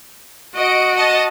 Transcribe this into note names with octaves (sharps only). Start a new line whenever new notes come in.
F#4 D#5 D7
D#5 A5